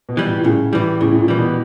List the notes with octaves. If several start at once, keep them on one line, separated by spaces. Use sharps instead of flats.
B2
E3 G3
A2
A#2
A2 C#3
A2 E3 G3
A2 C#3
A2
A#2
E3 G3
B2